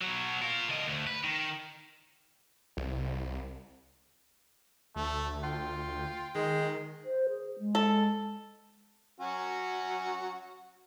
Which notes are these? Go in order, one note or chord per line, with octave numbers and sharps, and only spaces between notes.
B2 F#3
F4 A#4
D3 D#5
D2
B4
D#3
C2
D2 A3
F4 G5
D#3 G#3
C5
G#4
G#3
A4
F#3 C#4 F#4